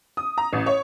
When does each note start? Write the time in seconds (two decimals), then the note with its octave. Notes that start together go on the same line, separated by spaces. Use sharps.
0.17 D#6
0.38 A#5
0.53 A1
0.66 C#5